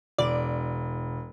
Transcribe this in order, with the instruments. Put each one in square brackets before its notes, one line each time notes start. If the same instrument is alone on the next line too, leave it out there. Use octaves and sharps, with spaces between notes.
[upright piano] E1 [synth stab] D5